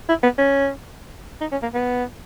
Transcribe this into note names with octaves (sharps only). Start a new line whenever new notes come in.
E4
B3
C#4
D#4
C#4
A#3
B3